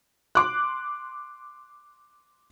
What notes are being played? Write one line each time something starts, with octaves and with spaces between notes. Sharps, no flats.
C6 D6 F#6